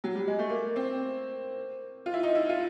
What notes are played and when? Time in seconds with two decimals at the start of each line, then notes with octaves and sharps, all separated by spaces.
0.04 F#3
0.15 G3
0.28 G#3
0.39 A3
0.49 A#3
0.76 C4
2.06 F4
2.14 E4
2.23 D#4
2.35 E4
2.49 F4